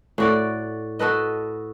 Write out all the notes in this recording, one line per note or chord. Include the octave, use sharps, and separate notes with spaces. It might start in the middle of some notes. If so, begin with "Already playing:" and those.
A2 F#4 D5
F#4 A4 B4 D#5